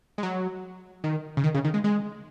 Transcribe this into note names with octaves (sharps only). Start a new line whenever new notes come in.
G#3
F#3
D#3
C#3
D#3
C#3
D#3
G#3
G#3